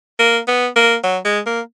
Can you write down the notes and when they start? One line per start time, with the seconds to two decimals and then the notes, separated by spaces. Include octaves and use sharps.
0.19 A#3
0.47 B3
0.76 A#3
1.03 F#3
1.25 G#3
1.46 A#3